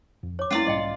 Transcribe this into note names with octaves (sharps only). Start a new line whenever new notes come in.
F2
C#5 D6
G#3 A#3 B3 C#4 E4 F4 D5
B1 G#2 G3 D#5 G5